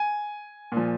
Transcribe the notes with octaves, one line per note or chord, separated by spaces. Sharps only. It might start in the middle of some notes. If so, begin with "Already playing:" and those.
Already playing: G#5
A#2 F3